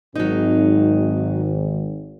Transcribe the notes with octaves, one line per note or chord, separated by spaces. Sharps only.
G#1 F#3 D#4